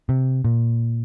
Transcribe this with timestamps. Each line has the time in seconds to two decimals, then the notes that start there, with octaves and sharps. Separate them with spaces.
0.09 C3
0.45 A#2